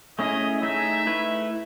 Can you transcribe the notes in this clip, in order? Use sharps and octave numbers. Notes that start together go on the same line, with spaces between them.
A3 C#4 E4 G#4 D#5
A3 D#4 G#4 E5
A3 E4 B4